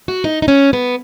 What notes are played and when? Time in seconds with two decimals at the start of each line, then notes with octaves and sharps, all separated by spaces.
0.08 F#4
0.24 D#4
0.42 D#4
0.48 C#4
0.73 B3